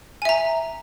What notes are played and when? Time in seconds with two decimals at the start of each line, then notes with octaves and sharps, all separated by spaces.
0.22 G#5
0.25 E5
0.29 A#5